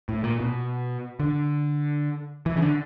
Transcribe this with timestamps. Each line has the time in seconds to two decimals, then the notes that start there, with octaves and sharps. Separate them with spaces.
0.09 A2
0.24 A#2
0.40 B2
1.20 D3
2.46 E3
2.57 C#3
2.62 D3